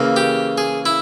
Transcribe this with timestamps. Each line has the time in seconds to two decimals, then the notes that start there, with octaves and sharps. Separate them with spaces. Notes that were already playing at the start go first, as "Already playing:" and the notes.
Already playing: C#3 E3 A#3
0.16 G4
0.58 G#4
0.86 E4